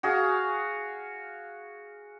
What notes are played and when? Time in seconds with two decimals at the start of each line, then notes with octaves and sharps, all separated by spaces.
0.03 F#4 G#4 F5